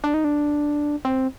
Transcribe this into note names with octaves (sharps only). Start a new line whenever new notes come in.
D4
D#4
D4
C4